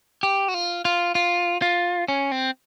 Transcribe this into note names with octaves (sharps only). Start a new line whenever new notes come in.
G4
F#4
F4
F4
F4
F4
C#4
C4